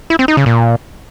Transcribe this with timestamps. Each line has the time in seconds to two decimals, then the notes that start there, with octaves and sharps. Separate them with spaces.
0.10 E4
0.19 C4
0.28 D#4
0.37 C#3
0.46 A#2